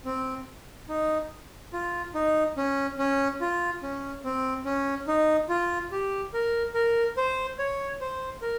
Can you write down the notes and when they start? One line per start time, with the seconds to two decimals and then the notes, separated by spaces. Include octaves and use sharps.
0.05 C4
0.89 D#4
1.73 F4
2.14 D#4
2.57 C#4
2.99 C#4
3.41 F4
3.83 C#4
4.25 C4
4.65 C#4
5.07 D#4
5.49 F4
5.92 G4
6.34 A#4
6.74 A#4
7.17 C5
7.59 C#5
8.01 C5
8.42 A#4